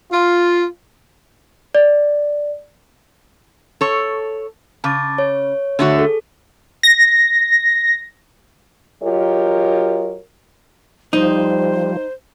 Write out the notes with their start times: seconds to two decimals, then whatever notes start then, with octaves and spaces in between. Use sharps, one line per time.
0.11 F4
1.75 D5
3.81 A4 C#5
4.84 C#3 A5 D6 A6
5.18 C#5
5.79 D3 A3 F#4
5.99 G#4 A4
6.83 A#6
9.02 F#3 F4 G4 A#4 C#5 D#5
11.13 F3 G3 D#4 C5